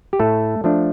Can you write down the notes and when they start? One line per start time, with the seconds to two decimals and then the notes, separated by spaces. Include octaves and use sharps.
0.13 G4
0.20 A2 A3 A4
0.64 F3 A3 D4